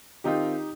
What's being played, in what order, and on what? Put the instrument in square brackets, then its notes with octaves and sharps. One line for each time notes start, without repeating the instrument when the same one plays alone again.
[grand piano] D#3 C4 F4 [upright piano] D#4 G4